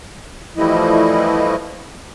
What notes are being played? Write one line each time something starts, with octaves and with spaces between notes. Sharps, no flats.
E3 F3 G3 A3 E4 D#5